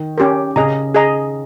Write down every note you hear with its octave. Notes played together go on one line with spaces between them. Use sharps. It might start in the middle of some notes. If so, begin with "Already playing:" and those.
Already playing: D#3
C#4 G4 A#4
C#3 G#4 D#5 A#5
G#4 D#5 A#5